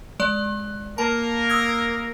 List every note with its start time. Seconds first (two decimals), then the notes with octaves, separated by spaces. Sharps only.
0.20 G#3 D5
0.98 A#3 A#4 A5
1.49 D#6 E6 G#6